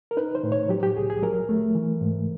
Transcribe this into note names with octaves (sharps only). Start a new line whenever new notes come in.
A#4
D#4 B4
C5
A2
C#5
F#3 G4
G4
C2 G#4
G#4
F#3 A#4
A3
E3
G#2